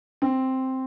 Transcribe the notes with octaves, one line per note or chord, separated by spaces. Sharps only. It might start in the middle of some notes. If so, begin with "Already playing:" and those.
C4